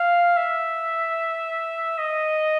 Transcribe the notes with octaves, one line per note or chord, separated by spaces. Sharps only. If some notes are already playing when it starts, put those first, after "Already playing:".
Already playing: F5
E5
D#5